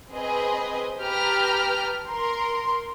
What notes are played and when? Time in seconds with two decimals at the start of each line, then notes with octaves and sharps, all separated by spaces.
0.12 C4 G#4 B4 D#5 G#5
1.00 G4 B4 G5 A5 A#5 F6
2.07 A#4 C6